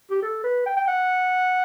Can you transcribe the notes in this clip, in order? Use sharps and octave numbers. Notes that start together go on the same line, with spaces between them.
G4
A4
B4
G5
G5
F#5